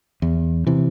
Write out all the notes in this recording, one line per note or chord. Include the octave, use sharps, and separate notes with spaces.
E2
C3 E3